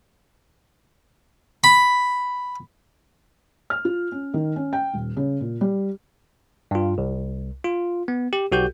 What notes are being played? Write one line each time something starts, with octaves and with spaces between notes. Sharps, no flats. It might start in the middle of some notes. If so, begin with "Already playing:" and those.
B5
F6
F4
C#4
D#3
C#4
G5
D#1
C#3
A#2
G3
G2 F4
C2
F4
B3
G4
B1 F#4 G4 G6